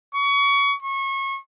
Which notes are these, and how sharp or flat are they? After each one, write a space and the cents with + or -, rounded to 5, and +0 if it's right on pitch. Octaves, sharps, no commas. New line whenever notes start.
C#6 +25
C#6 -30